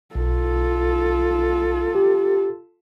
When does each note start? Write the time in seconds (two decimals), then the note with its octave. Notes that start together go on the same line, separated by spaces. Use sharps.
0.15 B1 F4 A4
1.95 G4